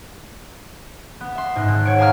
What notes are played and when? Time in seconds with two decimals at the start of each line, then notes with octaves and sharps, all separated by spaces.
1.21 B3
1.35 E5 C6
1.56 G#2 D#5 F#6
1.68 G#1
1.85 C#5 F#5 D7
1.98 E5 F5 G#5 A#5 D#6 F6